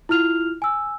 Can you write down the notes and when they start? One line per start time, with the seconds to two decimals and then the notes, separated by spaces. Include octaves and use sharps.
0.09 E4 F4 F6 F7
0.62 G#5 E6